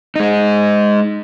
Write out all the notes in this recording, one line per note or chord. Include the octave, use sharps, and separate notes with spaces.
G#3 D#4